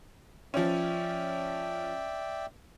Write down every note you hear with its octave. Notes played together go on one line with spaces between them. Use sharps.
F3 C#4 D5 E5 G5